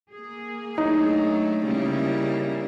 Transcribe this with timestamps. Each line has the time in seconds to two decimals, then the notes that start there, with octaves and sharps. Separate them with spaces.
0.11 A#3 G#4
0.78 F#3 A3 D4 D#4
1.63 C#3 G3 A#3 E4